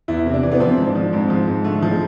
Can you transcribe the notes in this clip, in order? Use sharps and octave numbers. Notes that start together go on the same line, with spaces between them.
E2 E4
C3
D4
E3
B3
F3 C4
G#2
D4
F3
G#2 C4
F3
G#2
D3 A3
F3
G#3